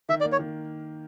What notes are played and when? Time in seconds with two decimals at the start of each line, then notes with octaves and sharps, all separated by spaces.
0.09 D#3 E5
0.21 D5
0.24 A#3
0.32 C#5
0.39 D#3